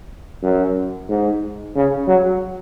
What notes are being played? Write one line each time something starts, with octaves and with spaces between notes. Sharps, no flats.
F#2
G#2
C#3
F#3